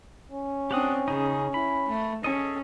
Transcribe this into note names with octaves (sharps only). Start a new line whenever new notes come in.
C#4
C4 D4 G4 F#5 D#6
C#3 D#4 G#4
E4 B5
A3
C#4 G#4 A4 D#5